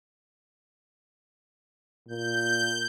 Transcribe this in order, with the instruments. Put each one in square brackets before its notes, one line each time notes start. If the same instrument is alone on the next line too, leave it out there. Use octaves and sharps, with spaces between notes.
[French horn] A#2 [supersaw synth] G6